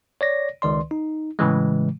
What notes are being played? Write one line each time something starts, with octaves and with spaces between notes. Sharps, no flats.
C#5 D5 A#6
C#2 D#3 D5 C6
D#4
A2 C#3 E3 G#3